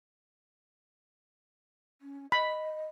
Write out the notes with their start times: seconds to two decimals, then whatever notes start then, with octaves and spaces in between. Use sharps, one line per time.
2.01 C#4
2.32 D#5 B5